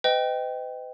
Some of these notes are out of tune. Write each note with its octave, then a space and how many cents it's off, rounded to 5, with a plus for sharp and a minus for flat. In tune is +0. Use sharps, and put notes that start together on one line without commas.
B4 +45 D#5 +0 G5 +0